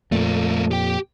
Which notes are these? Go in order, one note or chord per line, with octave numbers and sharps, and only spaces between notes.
F2 A#2 A3 A#3
G4 G5